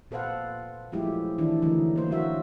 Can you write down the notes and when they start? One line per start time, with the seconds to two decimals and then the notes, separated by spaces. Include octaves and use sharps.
0.11 A#2 A4 B4 C5 F5 F#5
0.92 F3 F#3 G#3 A3 E4 G4
1.38 D#3 E3 D4 E4
1.62 D3 E3 F#3 A3 D#4
1.96 A#3 C5
2.11 F#3 F#4 E5